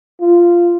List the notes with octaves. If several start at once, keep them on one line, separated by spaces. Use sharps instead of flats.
F4